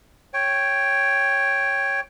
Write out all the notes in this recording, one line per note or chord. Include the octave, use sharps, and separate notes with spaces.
C#5 G5